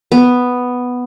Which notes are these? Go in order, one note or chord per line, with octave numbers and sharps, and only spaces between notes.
B3